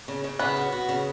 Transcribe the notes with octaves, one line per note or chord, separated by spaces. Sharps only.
C#3
C#3
C#3 B3
F#4
F#4
C#3